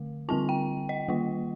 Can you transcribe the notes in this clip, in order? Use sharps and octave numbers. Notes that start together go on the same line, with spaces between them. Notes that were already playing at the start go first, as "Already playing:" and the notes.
Already playing: D3 A3
D3 G3 C4 F4 A5
G5
D#5
D#3 G3 A#3 F4